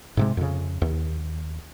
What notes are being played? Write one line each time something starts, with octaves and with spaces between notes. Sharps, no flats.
G#2 C3 G#3
F2 C#3
D#2